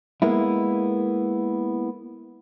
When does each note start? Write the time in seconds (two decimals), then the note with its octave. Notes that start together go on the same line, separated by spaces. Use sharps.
0.22 G#3 A#3 B3 E4